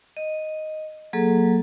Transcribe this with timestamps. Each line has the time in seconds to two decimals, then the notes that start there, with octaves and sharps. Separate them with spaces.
0.17 D#5
1.13 F#3 A#3 G#4 A4